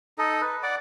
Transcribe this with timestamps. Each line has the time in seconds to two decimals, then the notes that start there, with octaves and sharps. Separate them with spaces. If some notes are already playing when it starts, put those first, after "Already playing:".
0.18 D#4 A4 D#5
0.41 B4
0.63 D5 F#5 D6